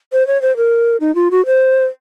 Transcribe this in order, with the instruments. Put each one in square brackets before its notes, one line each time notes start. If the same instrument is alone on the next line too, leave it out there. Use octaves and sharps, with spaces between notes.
[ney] C5
C#5
C5
A#4
D#4
F4
F#4
C5